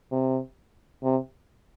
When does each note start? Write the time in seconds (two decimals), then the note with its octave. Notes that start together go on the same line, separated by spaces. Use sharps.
0.12 C3
1.03 C3